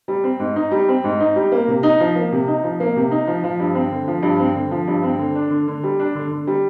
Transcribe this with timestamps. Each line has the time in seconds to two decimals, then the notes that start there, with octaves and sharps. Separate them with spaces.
0.08 G3
0.24 C4
0.40 G#2
0.56 D#4
0.71 G3
0.89 C4
1.04 G#2
1.20 D#4
1.36 G3
1.52 A#3
1.68 C3
1.83 D#4
2.00 F3
2.16 A#3
2.32 C3
2.48 D#4
2.63 F3
2.80 A#3
2.96 C3
3.11 D#4
3.27 F3
3.44 F3
3.60 G2
3.75 C4
3.91 D3
4.08 F3
4.23 G2
4.39 C4
4.55 D3
4.71 F3
4.88 G2
5.03 C4
5.18 D3
5.35 D4
5.50 D3
5.68 D3
5.84 G3
5.99 D4
6.15 D3
6.31 D3
6.47 G3